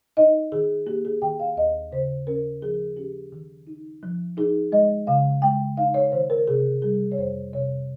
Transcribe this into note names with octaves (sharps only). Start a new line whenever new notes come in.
D#4 D#5
D#3 G#4
A#3 G4
G#4
D#3 G5
F5
D#2 D#5
C#3 C5
C#4 A#4
F3 G#4
C#4 G4
D#3
D#4
F3
D#4 G#4
G#3 D#5
C#3 F5
G#3 G5
D#4 F5
C#5
D#3 C5
A#4
C3 G#4
G3 G#4
C#5
F2 C5
C3 C#5